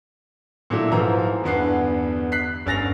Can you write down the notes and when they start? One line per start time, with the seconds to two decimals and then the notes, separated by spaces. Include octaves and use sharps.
0.70 A#2 F#3 A3 E4
0.91 G#2 E3 F3 A#5
1.44 E2 G2 D3 B3 F#5 C7
2.32 F#6 B6 C7
2.66 G1 C#4 A6 A#6 F7